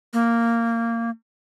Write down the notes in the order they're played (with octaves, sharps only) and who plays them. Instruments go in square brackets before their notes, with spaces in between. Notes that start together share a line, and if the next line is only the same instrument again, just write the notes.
[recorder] A#3